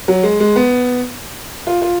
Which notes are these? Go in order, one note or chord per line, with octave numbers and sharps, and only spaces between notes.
F#3
G#3
G#3
B3
F4
F4